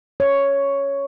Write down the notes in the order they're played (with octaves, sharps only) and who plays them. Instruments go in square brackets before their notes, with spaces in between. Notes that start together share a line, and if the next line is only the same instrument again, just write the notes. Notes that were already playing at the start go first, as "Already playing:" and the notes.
[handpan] C#5